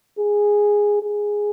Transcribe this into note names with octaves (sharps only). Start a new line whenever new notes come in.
G#4
G#4